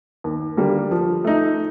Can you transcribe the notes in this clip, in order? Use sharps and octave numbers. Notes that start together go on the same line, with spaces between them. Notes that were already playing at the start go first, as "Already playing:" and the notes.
D#2
D3 G3 A#3
F3
A3 D#4